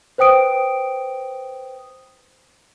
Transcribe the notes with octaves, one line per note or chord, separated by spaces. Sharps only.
B4 C5 G5 D#6 D7